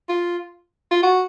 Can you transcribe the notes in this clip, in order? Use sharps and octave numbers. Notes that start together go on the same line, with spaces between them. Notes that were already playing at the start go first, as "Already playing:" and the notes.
F4
F4
F#4